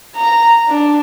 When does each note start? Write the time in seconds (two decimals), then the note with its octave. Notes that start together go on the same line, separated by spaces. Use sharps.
0.16 A#5
0.69 D4